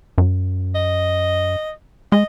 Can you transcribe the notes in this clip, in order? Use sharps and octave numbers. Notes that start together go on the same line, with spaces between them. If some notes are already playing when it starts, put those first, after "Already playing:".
F#2
D#5
G#3 D#5